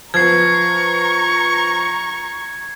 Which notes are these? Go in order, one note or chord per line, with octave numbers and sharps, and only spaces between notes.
F3 B3 A#5 C#6 G#6 C7